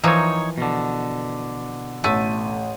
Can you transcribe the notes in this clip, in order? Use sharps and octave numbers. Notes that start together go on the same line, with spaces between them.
E3 F3 A#3 D#4 C#5
B2 D3
A1 A3 D#7